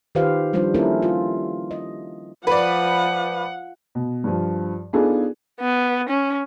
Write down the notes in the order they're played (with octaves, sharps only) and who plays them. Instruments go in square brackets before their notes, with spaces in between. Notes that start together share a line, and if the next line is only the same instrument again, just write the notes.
[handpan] D#3 F4 G4 B4 C5 F5
F3 G3 D4 F4 C5
A#3 C#4 D4 E4 A4 A#4
F4
D#5
[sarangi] F3 [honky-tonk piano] B4 D5 [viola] F#5
[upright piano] B2
G2 F3
B3 D4 D#4 F4 G#4 A4
[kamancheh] B3
C#4